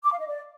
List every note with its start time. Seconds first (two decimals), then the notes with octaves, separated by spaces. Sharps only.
0.04 D6
0.12 F5
0.19 D#5
0.27 D5